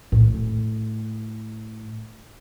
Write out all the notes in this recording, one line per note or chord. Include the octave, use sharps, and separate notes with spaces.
A2 A3